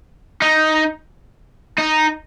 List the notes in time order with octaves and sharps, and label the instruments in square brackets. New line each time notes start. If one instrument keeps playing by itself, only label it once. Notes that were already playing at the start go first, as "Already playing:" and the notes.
[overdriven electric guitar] D#4
D#4